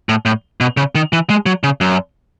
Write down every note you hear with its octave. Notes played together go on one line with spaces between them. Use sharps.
A2
A2
B2
C#3
D#3
E3
G#3
F#3
C#3
F#2